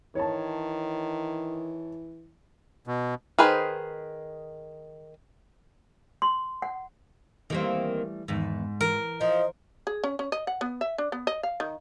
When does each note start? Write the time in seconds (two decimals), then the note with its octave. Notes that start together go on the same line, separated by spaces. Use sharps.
0.15 D#3 E3 C#5 A5
2.87 B2
3.39 D#3 G#4 B4 C5
6.22 C6
6.62 F#5
7.50 D#3 E3 G3 A3 A#3 C4
8.28 E2 G#2 D#3 B4
8.81 E3 A#4
9.21 F3 D#5
9.87 G#4
10.04 C#4
10.19 C#4
10.32 D#5
10.47 F#5
10.61 B3
10.81 E5
10.98 D4
11.12 B3
11.27 D#5
11.43 F5
11.60 D#3